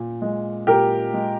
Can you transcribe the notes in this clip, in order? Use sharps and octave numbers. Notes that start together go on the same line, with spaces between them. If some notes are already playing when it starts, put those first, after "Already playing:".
Already playing: A#2
G#3
A#2 G4 A#4
G#3